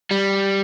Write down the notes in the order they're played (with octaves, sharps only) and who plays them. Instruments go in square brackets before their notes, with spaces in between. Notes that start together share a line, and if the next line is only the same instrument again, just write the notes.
[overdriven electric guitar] G3